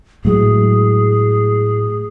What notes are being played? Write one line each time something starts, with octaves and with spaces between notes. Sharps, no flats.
A2 F#3 G#3 G#4